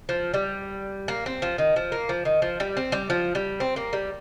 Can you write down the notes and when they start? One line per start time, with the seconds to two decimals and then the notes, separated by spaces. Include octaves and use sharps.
0.09 F3
0.34 G3
1.08 A#3
1.26 C4
1.42 F3
1.58 D#3
1.76 F3
1.92 A#3
2.09 F3
2.25 D#3
2.42 F3
2.60 G3
2.77 C4
2.92 G3
3.10 F3
3.35 G3
3.60 C4
3.76 A#3
3.93 G3